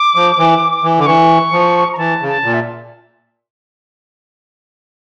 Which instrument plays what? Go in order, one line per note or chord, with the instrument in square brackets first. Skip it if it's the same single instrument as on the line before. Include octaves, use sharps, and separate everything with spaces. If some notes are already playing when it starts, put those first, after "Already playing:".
Already playing: [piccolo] D6
[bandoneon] F3
E3
E3
[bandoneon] D3 [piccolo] D6
[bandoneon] E3 [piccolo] C#6
[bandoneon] F3
[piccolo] A#5
[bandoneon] E3 [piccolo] A5
[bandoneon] C#3
[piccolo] A5
[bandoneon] A#2
[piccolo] E5